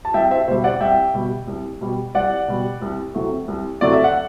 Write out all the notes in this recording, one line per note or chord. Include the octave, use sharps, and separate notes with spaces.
A5
C2 E5 G5
C5 E5
B2 G3 C5 E5
D5 F#5
C2 E5 G5
B2 G3
C2
B2 G3
C2 D5 F#5
B2 G3
C2
C3 F#3 A3
C2
C3 F#3 A3 D5
E5
F#5